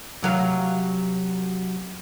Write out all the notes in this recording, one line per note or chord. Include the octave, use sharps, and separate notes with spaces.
C3 F#3 F5